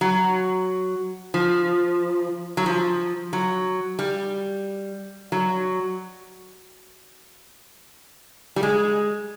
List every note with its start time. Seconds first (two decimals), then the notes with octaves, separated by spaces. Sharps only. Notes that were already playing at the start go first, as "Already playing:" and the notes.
0.01 F#3
1.34 F3
2.57 F#3
2.66 F3
3.33 F#3
3.99 G3
5.32 F#3
8.56 G3
8.63 G#3